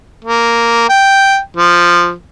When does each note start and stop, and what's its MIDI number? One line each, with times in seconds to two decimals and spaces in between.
0.24 0.88 58
0.89 1.38 79
1.57 2.12 53